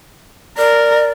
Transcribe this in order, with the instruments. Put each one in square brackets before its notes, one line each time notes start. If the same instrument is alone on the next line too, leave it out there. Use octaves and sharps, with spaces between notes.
[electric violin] A#4 [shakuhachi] D5